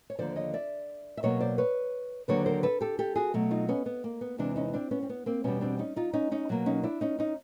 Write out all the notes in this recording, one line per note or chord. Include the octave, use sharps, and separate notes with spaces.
C#5
D#2 D3 F3 C5 D5
C#5 D#5
D5 E5
E5
B2 F#3 A#3 C#5 D#5
C5 D5
B4 C#5
D#2 D3 F#3 A#3 B4 C#5
A#4 C5
A4 B4
G4 A4
G4 A4
F#4 G#4
B2 F#3 A3
D#4 F4
B3 C#4
B3
A#3
B3
E2 C3 E3 G#3 C4 D4
C#4 D#4
C#4
C4 D4
B3 C#4
C4
B3
A#3 C4
E2 B2 G3 B3 C#4
C4 D4
C#4 D#4
D#4 F4
C#4 D#4
C#4 D#4
B2 F#3 A#3
C#4 D#4
D4 E4
C#4 D#4
C#4 D#4